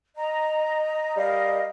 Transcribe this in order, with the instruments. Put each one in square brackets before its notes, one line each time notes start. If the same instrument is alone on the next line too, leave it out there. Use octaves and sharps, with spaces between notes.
[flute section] D#5 A#5
[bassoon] G3 [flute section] A#4 D#5 F5